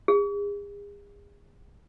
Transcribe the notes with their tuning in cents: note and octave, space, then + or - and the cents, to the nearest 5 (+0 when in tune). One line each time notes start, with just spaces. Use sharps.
G#4 -40